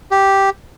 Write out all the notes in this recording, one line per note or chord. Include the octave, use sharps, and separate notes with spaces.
G4